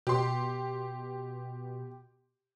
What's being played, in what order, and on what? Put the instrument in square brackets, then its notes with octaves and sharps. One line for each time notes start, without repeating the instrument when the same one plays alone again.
[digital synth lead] B2 [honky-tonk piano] G4 C6